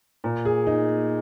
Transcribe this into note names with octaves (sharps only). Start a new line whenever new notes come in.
A#2
G#4
D#4